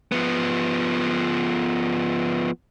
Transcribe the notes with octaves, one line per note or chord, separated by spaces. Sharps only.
F3 B3